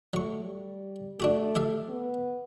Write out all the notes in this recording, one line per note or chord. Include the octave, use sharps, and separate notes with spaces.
F#3 A3 C#6
G3
A3 D4 F#4 G4
G4 E5 F5
B3